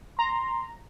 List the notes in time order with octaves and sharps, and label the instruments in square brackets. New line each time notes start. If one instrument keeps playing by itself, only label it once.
[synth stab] A#5 [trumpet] C6